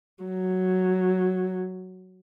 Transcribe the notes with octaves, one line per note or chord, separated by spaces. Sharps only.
F#3